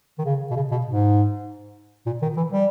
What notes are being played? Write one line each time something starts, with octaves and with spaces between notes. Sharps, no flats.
D#3
C#3
B2
C#3
B2
G#2
A#2
D#3
E3
G3